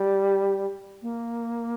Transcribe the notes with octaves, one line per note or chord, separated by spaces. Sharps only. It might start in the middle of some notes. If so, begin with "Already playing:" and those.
Already playing: G3
A#3